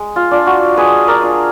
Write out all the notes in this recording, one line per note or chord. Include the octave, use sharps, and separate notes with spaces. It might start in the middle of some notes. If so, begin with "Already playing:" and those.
Already playing: G#3
F4
D4 F4
F#4
G#3 G#4 B4
A#4 D5
D4 F4